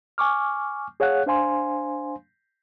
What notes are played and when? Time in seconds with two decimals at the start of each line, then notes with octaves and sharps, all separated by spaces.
0.18 G#5 C#6 D6 F6
1.00 G#4 C#5 F5 F#5 F#6
1.26 D4 C5 F5 G#5 C6